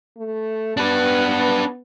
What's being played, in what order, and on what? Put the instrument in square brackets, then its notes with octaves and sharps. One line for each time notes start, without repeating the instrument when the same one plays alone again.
[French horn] A3
[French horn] B3 [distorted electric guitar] D4 B4